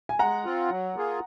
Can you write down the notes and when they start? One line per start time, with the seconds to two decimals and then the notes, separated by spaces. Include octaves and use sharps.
0.09 G#5
0.19 G#3 F#5 A#5
0.45 C4 F4
0.70 F#3
0.95 A#3 F4 G#4